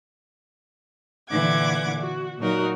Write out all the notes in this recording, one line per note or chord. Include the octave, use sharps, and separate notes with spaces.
A#2 D3 E3 F#5 D6 G#6
F#4
A#2 F#3 D#4 F#4 A#4